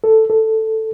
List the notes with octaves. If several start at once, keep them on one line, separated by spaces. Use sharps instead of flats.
A4
A4